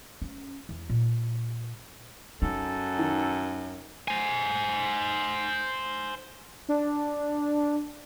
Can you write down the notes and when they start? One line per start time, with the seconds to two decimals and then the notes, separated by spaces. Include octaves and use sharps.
0.22 C#4
0.69 E2
0.89 A#2
2.42 F#2 D#4 A4
2.99 D#3
4.08 C5 G#5
6.69 D4